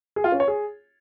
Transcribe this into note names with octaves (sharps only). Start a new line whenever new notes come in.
G#4
F4
C#4
C#5
G#4